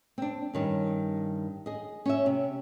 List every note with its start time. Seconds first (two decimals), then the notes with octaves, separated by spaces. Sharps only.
0.18 C4 D4
0.53 G2 D#3 C#4
1.66 G#4 D#5
2.06 C#4 C#5 E5
2.26 C3